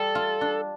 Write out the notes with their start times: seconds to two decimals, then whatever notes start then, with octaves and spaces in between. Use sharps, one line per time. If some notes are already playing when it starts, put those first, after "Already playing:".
Already playing: G3 A4
0.15 F4
0.41 D4